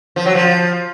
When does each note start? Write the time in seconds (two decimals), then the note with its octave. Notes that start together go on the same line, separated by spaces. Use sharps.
0.16 F3
0.26 F#3
0.35 F3